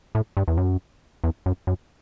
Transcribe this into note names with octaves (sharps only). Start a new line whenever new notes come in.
A2
G2
E2
F#2
E2
F#2
F#2